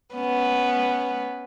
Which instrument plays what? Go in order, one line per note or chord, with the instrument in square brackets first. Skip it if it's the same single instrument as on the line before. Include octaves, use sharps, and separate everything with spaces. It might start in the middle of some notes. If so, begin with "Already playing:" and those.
[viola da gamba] B3 C#4